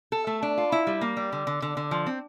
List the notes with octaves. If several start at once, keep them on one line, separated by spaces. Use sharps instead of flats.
A4
A3
D4
F4
E4
G3
A#3
G3
D3
D3
D3
D3
F3
C4